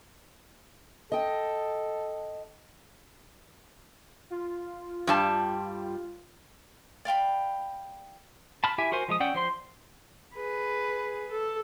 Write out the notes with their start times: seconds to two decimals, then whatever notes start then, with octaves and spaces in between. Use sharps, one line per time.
1.12 A4 D#5 G5
4.30 F4
5.07 G2 G3 A5
7.05 D5 F5 G5 B5
8.64 A5 B5 F6
8.78 E4 G4 E5 G#5
8.92 F#4 A#4 C5 G#5
9.08 F3 G#3 D#6
9.20 C#4 D5 F#5 G5 E6
9.35 F3 C5 C6
10.35 G#4 B4
11.32 A4